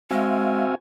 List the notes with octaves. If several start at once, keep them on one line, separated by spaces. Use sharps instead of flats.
G#3 C4 F#4 E5 F5 G#5